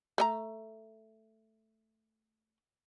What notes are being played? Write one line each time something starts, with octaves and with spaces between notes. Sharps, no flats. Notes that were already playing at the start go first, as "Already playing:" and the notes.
A3 D#5 A#5